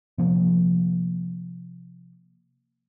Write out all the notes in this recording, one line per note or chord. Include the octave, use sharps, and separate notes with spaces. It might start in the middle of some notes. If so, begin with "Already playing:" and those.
C3 F3 A#3